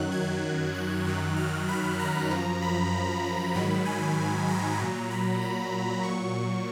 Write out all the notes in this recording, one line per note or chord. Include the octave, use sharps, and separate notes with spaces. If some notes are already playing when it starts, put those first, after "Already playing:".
Already playing: F#2 D#3 F#3 F#6
G#6
F#6
F#2 D#3 F#3
F6
B5
A#5
F#2 F3
B5
G#2 D#3 F#3 B5
G#5
A#5
A#2 F#3
B5
B5
A#2 C#6
F#3